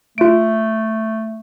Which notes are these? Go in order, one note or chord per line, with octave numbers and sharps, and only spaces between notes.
A3 F4 D7